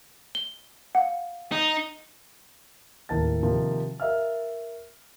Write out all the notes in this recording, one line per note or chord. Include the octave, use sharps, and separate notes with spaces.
G7
F5 F#5
D#4
D#1 A2 A#4 A5 A6
C3 D#3 F3 A#3
A#4 E5 F5 F6